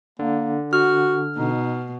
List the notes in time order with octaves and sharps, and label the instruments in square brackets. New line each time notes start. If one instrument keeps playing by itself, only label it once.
[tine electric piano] D3 [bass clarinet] A#3
[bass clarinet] F#4 [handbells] F6
[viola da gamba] B2 [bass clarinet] D#4